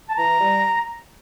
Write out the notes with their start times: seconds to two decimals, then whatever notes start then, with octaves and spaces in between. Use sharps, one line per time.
0.09 A5
0.16 E3 A#5
0.39 G3